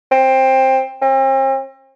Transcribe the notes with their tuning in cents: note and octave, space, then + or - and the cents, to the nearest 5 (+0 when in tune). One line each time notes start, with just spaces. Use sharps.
C4 +15
C4 +45